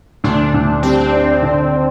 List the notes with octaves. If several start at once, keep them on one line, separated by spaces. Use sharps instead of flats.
D2 D4
D2
G3 C4
D4
D3
D4